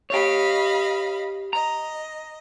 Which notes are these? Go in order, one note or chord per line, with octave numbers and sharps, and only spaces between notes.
G4 C#5 D#5 F5 B5
D#5 A#5